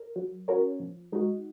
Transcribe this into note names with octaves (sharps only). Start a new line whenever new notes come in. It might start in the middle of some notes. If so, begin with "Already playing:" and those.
Already playing: A#4
F#3
C#4 F#4 A#4 C#5
F3
G#3 D#4 F#4